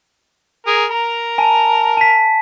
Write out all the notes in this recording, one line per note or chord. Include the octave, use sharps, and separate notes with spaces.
G#4 A#4
A#4 A#5
G#5 A5
A5 B6